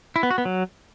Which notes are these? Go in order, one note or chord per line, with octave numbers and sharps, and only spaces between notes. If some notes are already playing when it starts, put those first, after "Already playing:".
E4
B3
F#4
B3
F#3